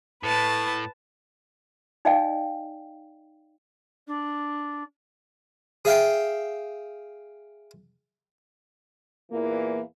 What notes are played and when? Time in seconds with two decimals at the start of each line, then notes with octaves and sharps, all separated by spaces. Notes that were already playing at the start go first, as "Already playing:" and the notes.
0.24 A2 B4 A5
2.05 D#4 D5 D#5 F5 G5 G#5
4.07 D4
5.85 G#4 E5 F5 G5
9.32 E2 A#2 E3 A#3